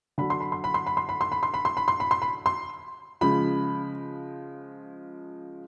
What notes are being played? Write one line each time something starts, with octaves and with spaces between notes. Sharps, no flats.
D3 F#3 B5
C6
B5
C6
B5
C6
B5
C6
B5
C6
B5
C6
B5
C6
B5
C6
B5
C6
B5
C6
C#3 F3 G#3 B5